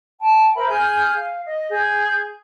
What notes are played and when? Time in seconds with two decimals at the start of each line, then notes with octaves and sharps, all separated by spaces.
0.19 G5 A5
0.54 A#4 C5 E5 B5
0.68 G#4 G#5 F6 G6
1.13 F5
1.45 D#5
1.70 G#4 G6